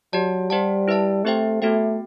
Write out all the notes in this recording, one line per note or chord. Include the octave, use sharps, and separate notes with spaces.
F#3 G4 D5 A5
G3 G4 C5 F#5 A5
E4 B4 E5 A5
A3 C4 G4 C5 E5 G5
A3 B3 F#4 A4 E5 G5